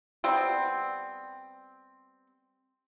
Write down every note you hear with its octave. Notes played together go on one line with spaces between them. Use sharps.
G3 B3 C4